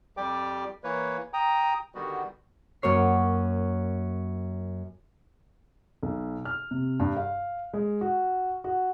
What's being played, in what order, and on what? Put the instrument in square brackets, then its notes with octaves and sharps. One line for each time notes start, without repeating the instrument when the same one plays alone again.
[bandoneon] F2 G3 G4 D5 G5 D6
E3 A#3 B4 C#5
G5 A#5 D#6
D3 D#3 G3 B3 F#4
[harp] F#2 A#3 C#5 C7
[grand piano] B1
F6
C3
G2
F5
G#3
F#4
F#4